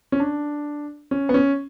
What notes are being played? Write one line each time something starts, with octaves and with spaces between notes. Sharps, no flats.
C#4
D4
C#4
B3
C#4